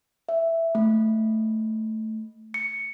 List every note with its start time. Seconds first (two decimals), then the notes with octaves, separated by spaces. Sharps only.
0.29 E5
0.75 A3
2.54 C#7